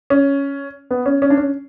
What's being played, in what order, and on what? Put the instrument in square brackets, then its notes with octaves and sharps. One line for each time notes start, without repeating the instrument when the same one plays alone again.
[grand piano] C#4
B3
C#4
C#4
D4
C#4